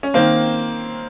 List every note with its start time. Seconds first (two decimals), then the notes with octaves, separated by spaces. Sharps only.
0.03 C#4
0.14 D#3 A#3 C4